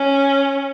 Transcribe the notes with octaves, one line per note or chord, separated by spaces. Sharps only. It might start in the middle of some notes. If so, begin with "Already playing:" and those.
Already playing: C#4